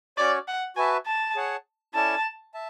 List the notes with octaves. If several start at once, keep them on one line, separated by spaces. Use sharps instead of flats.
C#4 F#4 C#5 D5
F#5
F#4 B4 E5 G#5 A5
A5
G#4 C#5 F#5 A5
C#4 E4 A4 D5 G#5 A5
E5 A5